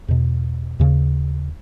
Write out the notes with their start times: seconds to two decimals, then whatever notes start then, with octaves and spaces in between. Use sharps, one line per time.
0.08 E2 B2
0.80 D#2 C#3